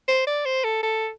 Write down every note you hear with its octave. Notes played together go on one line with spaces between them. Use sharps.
C5
D5
C5
A4
A4